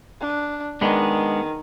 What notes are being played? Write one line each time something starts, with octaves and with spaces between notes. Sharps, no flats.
D4
D#3 G#3 B3 D4